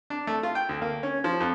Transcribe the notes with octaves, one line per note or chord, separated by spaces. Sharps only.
D4
A3
F4
G5
D2
A#3
C#4
F3
F2